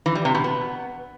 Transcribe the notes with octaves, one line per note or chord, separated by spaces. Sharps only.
E3
G3
C3
B2
B3